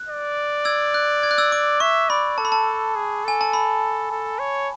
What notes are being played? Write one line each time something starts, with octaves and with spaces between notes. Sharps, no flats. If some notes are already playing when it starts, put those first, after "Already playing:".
Already playing: F#6
D5
E6 G#6
F#6
G#6
F#6
E6 G#6
D6
E5 C#6
D5 B5
A4 A5
B5
A5
G#4
A4 G#5
A5
B5
A4
C#5